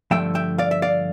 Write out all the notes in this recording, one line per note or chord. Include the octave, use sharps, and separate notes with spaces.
G2 D3 F3 A3 E5 G5
E5 G5
D5 F5
E5
D5 F5